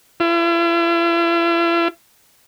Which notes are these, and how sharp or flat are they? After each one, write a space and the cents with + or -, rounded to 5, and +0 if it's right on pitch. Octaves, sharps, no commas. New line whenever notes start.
E4 +45